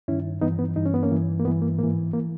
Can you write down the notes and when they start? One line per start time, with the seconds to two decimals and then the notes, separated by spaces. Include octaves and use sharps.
0.08 G2 D#3 C#4 E4
0.41 G2 E3 B3 D#4
0.59 B3
0.76 G2 E3 D#4
0.86 C#4
0.94 B3
1.03 A#3 C#4
1.11 G2 E3
1.39 A#3
1.44 G2 E3 B3
1.62 A#3
1.79 G#2 E3 A#3
2.13 E3 A#3